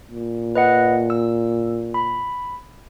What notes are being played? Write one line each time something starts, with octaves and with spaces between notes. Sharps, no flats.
A#2
B4 D#5 F#5
E6
B5